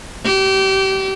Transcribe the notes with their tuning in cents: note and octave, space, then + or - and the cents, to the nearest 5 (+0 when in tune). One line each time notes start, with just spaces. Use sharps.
G4 -30